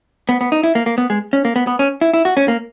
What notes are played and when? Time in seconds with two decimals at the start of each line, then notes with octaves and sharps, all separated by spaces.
0.29 B3
0.41 B3
0.52 D#4
0.63 E4
0.75 A#3
0.86 A#3
0.98 B3
1.10 G#3
1.33 C#4
1.45 A#3
1.56 B3
1.67 B3
1.79 C#4
2.01 E4
2.14 E4
2.25 F#4
2.37 C#4
2.48 A#3